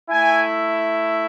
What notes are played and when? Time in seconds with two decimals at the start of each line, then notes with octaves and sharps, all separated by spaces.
0.11 A3 E4 G#5